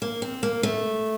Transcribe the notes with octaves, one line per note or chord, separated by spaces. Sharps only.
A#3
C4
A#3
A3